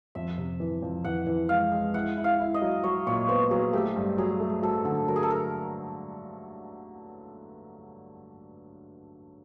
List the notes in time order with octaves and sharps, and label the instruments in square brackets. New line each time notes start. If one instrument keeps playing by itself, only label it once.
[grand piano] F2 [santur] E5
[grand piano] C3
E3
F2
[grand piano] E3 [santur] F#5
[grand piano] E3
[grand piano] G#3 [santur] F5
[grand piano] G#3
[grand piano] E4 [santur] F#5
[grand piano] E4
[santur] F5
[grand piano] E4
[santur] D#5
[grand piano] F#3
[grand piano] F#3 [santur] C#5
[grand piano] A#2 [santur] C#5
[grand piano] B3 [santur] C5
[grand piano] F#3 [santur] G#4
[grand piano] A3 [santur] G4
[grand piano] G2
[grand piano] F#3 [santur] G#4
[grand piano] A3
[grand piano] F#3 [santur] A4
[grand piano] D3 [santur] A4
[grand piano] F#3 [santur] A#4
[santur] G#4
A4
A#4